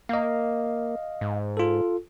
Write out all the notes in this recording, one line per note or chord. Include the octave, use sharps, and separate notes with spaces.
A#3 D#5 F5
G#2
F4 A4